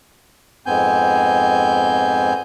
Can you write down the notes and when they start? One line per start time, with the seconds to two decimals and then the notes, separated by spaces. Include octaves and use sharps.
0.66 F2 G#2 B3 C4 G#5 G6